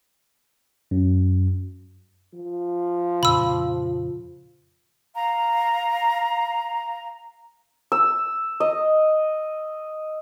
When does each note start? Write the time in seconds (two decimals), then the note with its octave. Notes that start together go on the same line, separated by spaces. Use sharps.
0.91 F#2
2.34 F3
3.23 F2 A#2 C#3 B5 E6
5.14 F5 A#5
7.92 E6
8.60 D#5